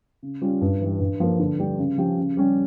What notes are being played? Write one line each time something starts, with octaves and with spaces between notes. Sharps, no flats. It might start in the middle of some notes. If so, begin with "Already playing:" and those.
C#3
G3 C#4 F4
G2
E3 G3
G2
F3 A#3
D3
G3 D4 G4
C#3
F3 C#4 G4
C#3
G3 C#4 G4